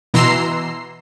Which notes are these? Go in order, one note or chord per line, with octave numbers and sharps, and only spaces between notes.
B2 E3 A#5 C6 E6 C7